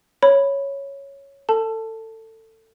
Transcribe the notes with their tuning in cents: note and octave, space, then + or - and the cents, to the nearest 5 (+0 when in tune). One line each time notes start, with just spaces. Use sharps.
C#5 +0 B5 +0
A4 +25 A5 +0